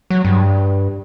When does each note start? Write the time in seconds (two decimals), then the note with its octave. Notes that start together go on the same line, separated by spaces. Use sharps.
0.10 F#3
0.25 G2